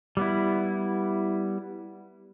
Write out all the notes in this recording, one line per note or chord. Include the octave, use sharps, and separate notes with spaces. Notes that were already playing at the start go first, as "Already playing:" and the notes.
G3 B3 E4